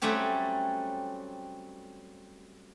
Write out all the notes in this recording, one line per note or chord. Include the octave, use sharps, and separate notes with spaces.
F#3 G3 A3 C4 C#4 G4